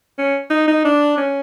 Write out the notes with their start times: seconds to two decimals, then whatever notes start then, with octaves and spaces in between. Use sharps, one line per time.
0.18 C#4
0.50 D#4
0.68 D#4
0.85 D4
1.17 C#4